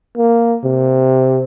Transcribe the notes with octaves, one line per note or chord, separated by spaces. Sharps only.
A#3
C3